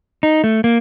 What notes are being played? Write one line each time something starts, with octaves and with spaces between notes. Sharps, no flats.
D#4
A3
A#3